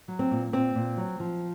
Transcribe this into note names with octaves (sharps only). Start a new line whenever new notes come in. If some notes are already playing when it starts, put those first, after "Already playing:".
F#3
C4
A#2
A#2 C4
A#2
F#3
F3